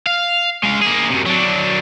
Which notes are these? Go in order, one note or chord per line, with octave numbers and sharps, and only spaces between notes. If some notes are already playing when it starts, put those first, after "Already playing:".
F5
G#3 F5
A#3 G#4
F#2 C3
F#3 D4